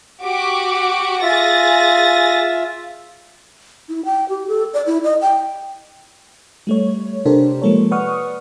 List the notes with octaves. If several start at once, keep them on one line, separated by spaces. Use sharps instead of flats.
F#4 G4 D6
F4 G#4 E5 A6 A#6
E4
G5
G4
A4
D5
E4
D#5
G5
G3 A3 C#5
C3 D4 G4 A4 A#4 C5
F3 G#3 A#3 A4 C#5
B4 D5 F#5 C#6 D#6 F6